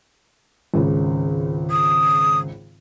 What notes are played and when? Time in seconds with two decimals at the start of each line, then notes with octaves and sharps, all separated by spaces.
0.74 G#1 C#2 C#3
1.71 D#6